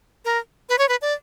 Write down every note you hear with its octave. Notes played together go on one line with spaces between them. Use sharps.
A#4
B4
C#5
B4
D5